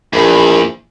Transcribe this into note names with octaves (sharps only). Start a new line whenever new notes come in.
A#1 E2